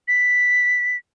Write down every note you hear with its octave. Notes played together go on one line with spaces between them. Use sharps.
B6